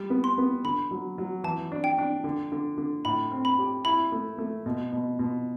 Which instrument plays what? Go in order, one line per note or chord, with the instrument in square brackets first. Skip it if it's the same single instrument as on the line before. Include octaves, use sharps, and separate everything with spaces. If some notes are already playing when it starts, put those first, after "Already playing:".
Already playing: [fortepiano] G3
B3
[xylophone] C6
[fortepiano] B3
[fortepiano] D3 [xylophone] B5
[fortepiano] F#3
F#3
[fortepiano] E3 [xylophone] A5
[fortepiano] D4
[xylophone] G5
[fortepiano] D4
D3
D3
D3
[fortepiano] A2 [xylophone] B5
[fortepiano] C4
[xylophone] B5
[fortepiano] G4
[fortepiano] E4 [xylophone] B5
[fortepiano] A3
A3
B2
B2
B2